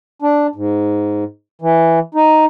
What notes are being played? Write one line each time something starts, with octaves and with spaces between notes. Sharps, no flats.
D4
G#2
E3
D#4